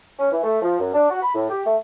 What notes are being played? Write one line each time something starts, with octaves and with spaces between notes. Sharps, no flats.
C#4
E3
A3
F3
F#2
D4
F#4
B5
A2
G4
A3